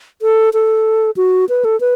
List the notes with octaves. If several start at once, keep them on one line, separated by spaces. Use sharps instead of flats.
A4
A4
F#4
B4
A4
B4